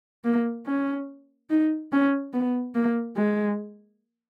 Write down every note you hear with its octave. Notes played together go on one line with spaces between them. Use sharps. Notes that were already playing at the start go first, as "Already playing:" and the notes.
A#3
C#4
D#4
C#4
B3
A#3
G#3